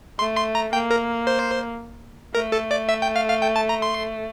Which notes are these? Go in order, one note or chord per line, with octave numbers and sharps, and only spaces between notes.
A3 C6
C6
A#5
A#3 G5
A#4
C5
A3 A#4
A4
D5
E5
G5
F5
F5
G5
A5
A#5
C6